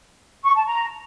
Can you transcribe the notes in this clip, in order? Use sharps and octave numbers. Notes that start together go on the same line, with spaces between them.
C#6
A5
A#5